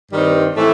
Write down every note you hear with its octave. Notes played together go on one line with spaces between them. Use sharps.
G2 D#3 G3 C4 D#4
A2 E3 A3 C4 E4